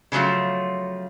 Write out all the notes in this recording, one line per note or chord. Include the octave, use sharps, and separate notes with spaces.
C#3 F3 F#3 A3 F4